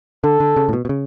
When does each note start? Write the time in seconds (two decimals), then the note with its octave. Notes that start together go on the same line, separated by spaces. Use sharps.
0.24 D3 A4
0.40 D3
0.57 C#3
0.69 A2
0.73 B2
0.85 B2
0.89 C#3